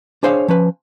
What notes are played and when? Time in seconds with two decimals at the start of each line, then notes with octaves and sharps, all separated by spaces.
0.23 D4 G#4 C5 C#5 F5
0.48 F3 C#4 B4